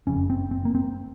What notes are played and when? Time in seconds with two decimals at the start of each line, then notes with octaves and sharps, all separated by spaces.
0.07 F#1 F2 C#3 C#4
0.30 C4
0.51 C4
0.65 A#3
0.75 C4